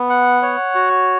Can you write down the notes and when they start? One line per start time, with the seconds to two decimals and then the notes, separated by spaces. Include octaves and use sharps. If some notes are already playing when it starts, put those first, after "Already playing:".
Already playing: B3
0.09 F#5
0.42 C#5
0.75 F#4